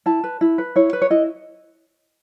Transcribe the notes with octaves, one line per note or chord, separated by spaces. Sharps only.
E4 A5
B4
E4
B4
E4 C#5
B4
C#5
E4 D#5